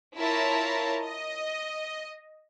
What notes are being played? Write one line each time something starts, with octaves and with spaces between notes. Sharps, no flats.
E4 F4 A#4 C#5 A5 A#5
D#5